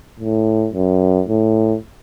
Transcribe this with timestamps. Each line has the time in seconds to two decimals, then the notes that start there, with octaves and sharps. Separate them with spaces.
0.20 A2
0.74 F#2
1.28 A2